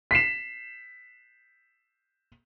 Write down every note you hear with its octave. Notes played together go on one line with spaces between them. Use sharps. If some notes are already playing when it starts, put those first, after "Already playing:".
B6 C7 E7